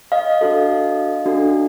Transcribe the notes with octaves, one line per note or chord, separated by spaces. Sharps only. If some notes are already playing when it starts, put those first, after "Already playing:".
D#5 F5
D4 F#4 A4
D4 F#4 A4